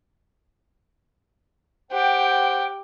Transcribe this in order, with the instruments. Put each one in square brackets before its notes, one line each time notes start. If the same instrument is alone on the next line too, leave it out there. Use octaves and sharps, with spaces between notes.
[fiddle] G4 [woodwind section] C5 F#5 G5